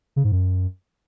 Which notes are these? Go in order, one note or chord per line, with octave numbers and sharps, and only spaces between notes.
C#3
G#2
F#2